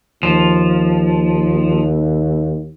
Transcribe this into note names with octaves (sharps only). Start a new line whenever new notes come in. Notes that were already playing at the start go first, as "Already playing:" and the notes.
D#2 F3